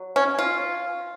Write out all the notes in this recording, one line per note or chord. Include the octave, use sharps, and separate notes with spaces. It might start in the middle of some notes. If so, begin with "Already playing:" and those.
Already playing: F#3
C#4
F4